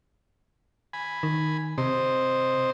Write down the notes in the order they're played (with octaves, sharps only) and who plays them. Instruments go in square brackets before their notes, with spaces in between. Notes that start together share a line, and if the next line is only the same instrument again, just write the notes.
[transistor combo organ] G#5 B5
[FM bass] D#3
[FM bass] C3 [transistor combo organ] C4 C5 D#5